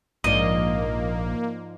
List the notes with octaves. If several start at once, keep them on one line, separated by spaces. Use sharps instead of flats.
A#1 G#2 F3 A#3 D5 D#5